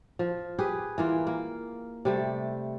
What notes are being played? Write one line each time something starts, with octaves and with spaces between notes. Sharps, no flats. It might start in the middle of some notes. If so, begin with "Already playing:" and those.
F3
G4 G#4 B4
E3 A#3 F4
A#3
C3 G3 A3